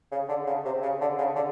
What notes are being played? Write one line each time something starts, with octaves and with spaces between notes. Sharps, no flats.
C#3
D3
C#3
C3
C#3
D3
C#3
D3